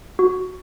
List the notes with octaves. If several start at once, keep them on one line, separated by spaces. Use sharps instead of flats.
F#4